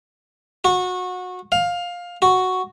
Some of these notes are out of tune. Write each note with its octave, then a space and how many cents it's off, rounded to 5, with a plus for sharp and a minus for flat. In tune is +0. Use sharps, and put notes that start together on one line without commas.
F#4 -25
F5 +15
F#4 +0